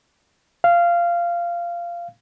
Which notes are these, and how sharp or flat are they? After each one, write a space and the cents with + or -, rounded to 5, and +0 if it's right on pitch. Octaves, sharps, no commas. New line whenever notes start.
F5 -15